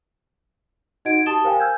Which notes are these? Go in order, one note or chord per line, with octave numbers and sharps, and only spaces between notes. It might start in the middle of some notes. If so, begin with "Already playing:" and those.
D#4 F#4 D#5 F#5 G#6 D7
G4 A5 D#6 A6 E7 G7
A#4 C5 F5 G5 G#5
G#5 E6 F6 G6 G#6